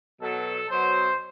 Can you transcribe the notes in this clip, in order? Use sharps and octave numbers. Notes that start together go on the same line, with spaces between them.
B2 F#3 A4
B2 F#3 C5